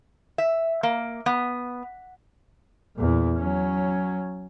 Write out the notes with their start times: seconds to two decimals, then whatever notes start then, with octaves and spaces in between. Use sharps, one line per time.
0.38 E5
0.83 A#3
1.26 B3
2.96 E2 A#2
3.38 F#3 C#4